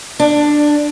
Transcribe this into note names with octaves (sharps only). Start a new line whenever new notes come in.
D4